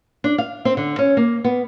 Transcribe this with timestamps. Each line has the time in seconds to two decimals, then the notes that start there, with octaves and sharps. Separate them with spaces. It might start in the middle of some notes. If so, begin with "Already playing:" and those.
0.24 D4
0.38 F5
0.65 C4
0.77 D3
0.99 C#4
1.17 A#3
1.44 B3